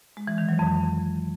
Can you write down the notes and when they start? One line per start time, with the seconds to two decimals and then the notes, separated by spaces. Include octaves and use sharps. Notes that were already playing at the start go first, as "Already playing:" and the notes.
0.17 G#3
0.27 E3
0.38 D#3
0.49 F#3
0.59 F2